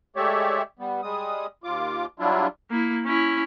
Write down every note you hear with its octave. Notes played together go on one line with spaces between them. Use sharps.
G#3 A3 G4 C#5 D5 E5
G3 B3
G3 G#3 D#6
D#2 F4 D6
F#3 G3 D4 E4 F4
A#3 E4
C#4 E4